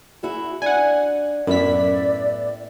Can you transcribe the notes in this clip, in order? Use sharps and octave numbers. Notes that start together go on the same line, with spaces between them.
E4 F#4 G#4
D4 F#5 G#5
F#2 A2 B3 E4 D5 B6